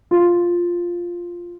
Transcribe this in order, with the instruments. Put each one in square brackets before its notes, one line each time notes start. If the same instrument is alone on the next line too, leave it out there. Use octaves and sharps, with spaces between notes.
[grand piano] F4